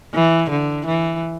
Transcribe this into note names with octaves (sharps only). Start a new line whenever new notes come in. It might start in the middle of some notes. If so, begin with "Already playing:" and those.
E3
D3
E3